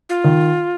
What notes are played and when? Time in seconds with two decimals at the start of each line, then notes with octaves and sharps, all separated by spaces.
0.09 F4
0.24 D#3